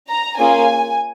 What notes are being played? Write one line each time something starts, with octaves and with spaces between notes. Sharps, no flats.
A#5
A#3 C#4 F4 G#4 G#5